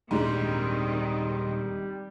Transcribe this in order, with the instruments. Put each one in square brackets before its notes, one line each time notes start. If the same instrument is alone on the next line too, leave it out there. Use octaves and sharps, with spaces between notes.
[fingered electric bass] D#1 [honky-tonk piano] G#2 G#3 D4 [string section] D#3 C4 [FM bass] G3